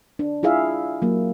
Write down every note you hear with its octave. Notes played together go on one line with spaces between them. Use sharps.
D4
E4 F4 G#4 E5 F5
F#3 A#3